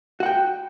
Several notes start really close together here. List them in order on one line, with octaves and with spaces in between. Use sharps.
F#4 F#5 G5